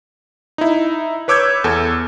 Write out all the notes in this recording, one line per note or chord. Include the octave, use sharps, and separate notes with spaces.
D#4 E4
B4 C#5 D6 E6 G6 G#6
E2 A4 E6